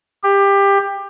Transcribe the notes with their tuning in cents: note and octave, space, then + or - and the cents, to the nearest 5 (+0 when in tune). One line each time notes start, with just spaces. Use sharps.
G4 +20